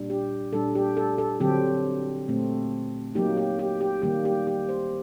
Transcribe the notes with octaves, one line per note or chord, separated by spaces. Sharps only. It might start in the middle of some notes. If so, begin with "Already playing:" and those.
Already playing: A#2 G3 D4
G4
A#2 G3 D4 A4
G4
A4
A4
D3 F#3 C4 G4
A#2 A3 C4
F#3 A#3 D#4 G4
G4
G4
G4
D#3 G3 A#3 G4
G4
G4
C5